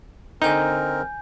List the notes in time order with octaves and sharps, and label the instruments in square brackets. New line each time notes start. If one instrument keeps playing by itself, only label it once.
[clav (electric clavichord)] D3 D#4 [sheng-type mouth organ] C4 A#4 [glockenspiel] G#5 G6